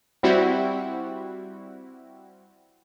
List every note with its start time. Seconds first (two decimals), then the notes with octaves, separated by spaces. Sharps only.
0.23 G3 C4 E4 F#4